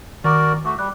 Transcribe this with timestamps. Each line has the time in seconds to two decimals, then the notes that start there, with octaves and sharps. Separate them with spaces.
0.24 D#3 F#4 A#4 D5 D6
0.65 A3 F#4 D6
0.78 G3 D6 F#6